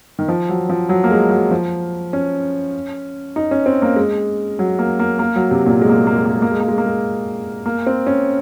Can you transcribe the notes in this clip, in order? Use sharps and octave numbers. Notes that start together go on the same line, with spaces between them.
D#3
F3
F#3
F3
F#3
A#3
G#3
F#3
F3
C#4
D#4
C#4
C4
A#3
G#3
F#3
A#3
A#3
A#3
F#3
C3
A#2
G#3
A#3
G#3
A#3
G#3
A#3
G#3
A#3
G#3
A#3
G#3
A#3
G#3
A#3
C4
C#4